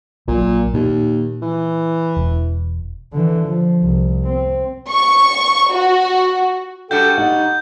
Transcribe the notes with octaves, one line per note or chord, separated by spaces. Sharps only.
A#1 A#2 F#3
D#2 A#2
E3
E1
D3 E3
F3
C2
C4
C#6
F#4
G3 D4 F#4 A4 G5 G6
D#4 F#5